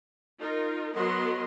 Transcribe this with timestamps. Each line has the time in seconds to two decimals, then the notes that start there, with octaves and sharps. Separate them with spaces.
0.40 D#4 F4 A#4
0.95 F#3 B3 F#4 A#4 D#5 C6